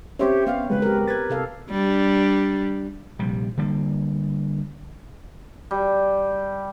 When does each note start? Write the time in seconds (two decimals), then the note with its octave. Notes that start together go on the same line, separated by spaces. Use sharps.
0.19 C4 C#4 G4 C5 C#5 E5 C6
0.47 B3 F5
0.70 C#3 F#3 G#3 B4
0.82 G4 A#4
1.08 B4 G#6 A6
1.30 C3 A4 F5
1.71 G3 D4
3.19 A#1 C3 G3
3.57 D3 G3 A#3
5.71 G3